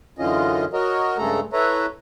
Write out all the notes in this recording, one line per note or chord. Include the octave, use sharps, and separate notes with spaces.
F#2 D3 E3 C#4 F4 D#5
F#4 A#4 C#5 D#5
G2 C#3 G#3 A3 A4 A#5
E4 A4 B4 C#5 E5 A#5